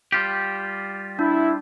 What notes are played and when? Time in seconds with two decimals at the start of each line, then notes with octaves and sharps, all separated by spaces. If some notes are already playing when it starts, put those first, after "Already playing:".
0.12 G3 F4 G4
1.19 D4 E4